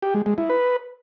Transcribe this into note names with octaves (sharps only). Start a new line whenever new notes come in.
G4
G#3
G#3
E4
B4